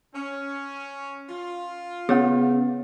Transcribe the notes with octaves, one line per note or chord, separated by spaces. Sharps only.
C#4
F4
C#3 B3 G#4 C#5 F#5